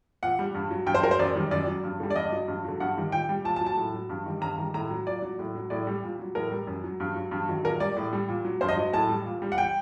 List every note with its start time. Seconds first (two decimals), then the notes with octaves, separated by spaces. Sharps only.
0.23 A#2 F#5
0.39 G3
0.55 G2
0.71 F#3
0.86 G2 G5
0.95 C5
1.03 F#3 A#4
1.11 C5
1.19 F#2 D5
1.36 D#3 G3
1.51 F#2 D5
1.67 F#3
1.84 G2
2.00 D3 G3
2.10 D5
2.16 G2 D#5
2.32 F#3
2.48 G2
2.64 D3 F#3
2.80 G2 F#5
2.97 D#3 G3
3.12 A#2 G5
3.29 G3
3.44 A#2 A5
3.56 A5
3.61 F#3
3.66 A5
3.77 A2
3.94 F#3
4.10 G2
4.26 D#3 G3
4.41 G2 A#5
4.58 D#3 G3
4.74 A2 A#5
4.90 F#3
5.06 A#2 D5
5.22 F#3
5.39 A2
5.55 F#3
5.70 A2 D5
5.87 G3
6.03 A#2
6.19 F#3
6.35 A2 A#4
6.51 G3
6.67 F#2
6.84 F#3
7.00 G2
7.16 F#3
7.31 G2
7.49 D#3 F#3
7.64 A#2 A#4
7.80 G3 D5
7.97 A2
8.13 G3
8.29 A#2
8.45 F#3
8.61 G2 C5
8.69 D#5
8.77 F#3
8.93 A2 A5
9.09 G3
9.26 A#2
9.42 G3
9.52 F#5
9.58 G5